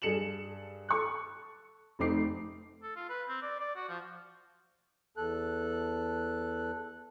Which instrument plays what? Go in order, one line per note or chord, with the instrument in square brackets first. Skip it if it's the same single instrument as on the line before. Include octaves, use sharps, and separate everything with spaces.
[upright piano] G2 G#4 A4 C#7 E7 F#7
A4 C#6 F#6
F1 A3 C4 D#4 D6 C7
[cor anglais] A4
F4
B4
C4
D5
D5
F#4
F3
[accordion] E2 A4 F#6